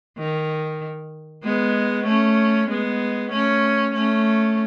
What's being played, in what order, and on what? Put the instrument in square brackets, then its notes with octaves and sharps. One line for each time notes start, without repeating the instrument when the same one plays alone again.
[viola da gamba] D#3
G#3 B3
A3 C#4
G#3 B3
A3 C#4
A3 C#4